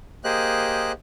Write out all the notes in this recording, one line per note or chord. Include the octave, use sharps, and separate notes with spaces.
A#3 G4 G#4 C5 D#5 F#6